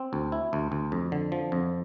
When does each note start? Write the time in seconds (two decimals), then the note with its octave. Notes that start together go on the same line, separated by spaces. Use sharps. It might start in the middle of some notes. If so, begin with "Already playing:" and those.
Already playing: C4
0.13 D2
0.32 E4
0.53 D2
0.72 D2
0.92 F2
1.12 D3
1.32 F3
1.52 F2